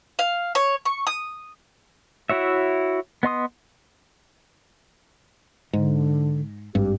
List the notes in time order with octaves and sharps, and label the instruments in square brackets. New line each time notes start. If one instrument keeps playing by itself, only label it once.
[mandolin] F5
C#5
C#6
D#6
[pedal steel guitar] E4 F#4 C#5 E5
B3 D#5 C6 D#6
[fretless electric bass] G#2 [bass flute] D3
[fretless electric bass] G#1 G2 [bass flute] G4